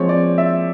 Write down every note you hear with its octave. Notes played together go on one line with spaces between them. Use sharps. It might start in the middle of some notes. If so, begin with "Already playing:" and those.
Already playing: F3 G#3 C4 C#5
D5
E5